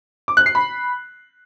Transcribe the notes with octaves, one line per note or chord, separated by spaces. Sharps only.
D6
F#6
C7
B5